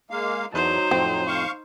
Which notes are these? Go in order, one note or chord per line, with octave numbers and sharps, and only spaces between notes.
G#3 A#3 F5
E2 F#3 D#4 C5 A5
F2 A2 C4
F5 C#6